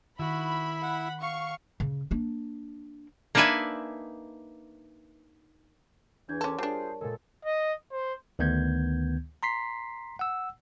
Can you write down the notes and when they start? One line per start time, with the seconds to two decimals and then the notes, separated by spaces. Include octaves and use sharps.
0.19 D#3 E4 F#4 B5
0.81 F#5
1.21 F5 C#6
1.80 C#3
2.11 A#3 D4
3.35 A#3 D4 D#4 B4 E5 G#5
6.29 E2 E3 D4 G6 G#6
6.41 C#4 A4 A#4 C#5 C6 D6
6.58 G3 D4 F4 G#4 C5 A5
7.01 A#2 G#3 A4 A#4
7.45 D#5
7.92 C5
8.39 D2 D#3 B3 G6 G#6
9.43 A#5 C6 B6 C7
10.19 F#5 E6